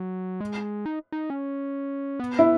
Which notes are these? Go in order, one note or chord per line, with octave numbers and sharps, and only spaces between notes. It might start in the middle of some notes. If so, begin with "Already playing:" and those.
Already playing: F#3
G#3
D#4
D#4
C#4
B3
E4